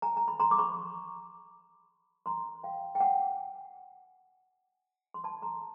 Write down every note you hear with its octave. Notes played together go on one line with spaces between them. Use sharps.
G#5 A#5
A#5
B5
A#5 C6
D6
B5 C#6
A#5 C6
F5 G5
G5
F#5 G#5
C6
A5 B5
A#5 C6